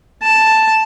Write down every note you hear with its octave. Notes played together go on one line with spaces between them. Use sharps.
A5